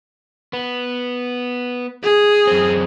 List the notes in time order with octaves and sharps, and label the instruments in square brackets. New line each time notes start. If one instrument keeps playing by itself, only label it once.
[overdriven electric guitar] B3
[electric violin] G#4
[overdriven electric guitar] F#2 C4